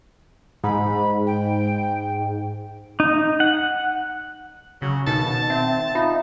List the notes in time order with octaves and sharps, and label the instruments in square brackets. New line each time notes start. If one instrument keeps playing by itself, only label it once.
[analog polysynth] G#2 [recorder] B5
[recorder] G5
[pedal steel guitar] D#4
F#5
[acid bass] C#3 [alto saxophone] F#3
[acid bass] B2 [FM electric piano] D#3 [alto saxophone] A5
[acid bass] C4 [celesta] E5 F#5 A6
[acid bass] D#4 [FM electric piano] F4 [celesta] E5 B5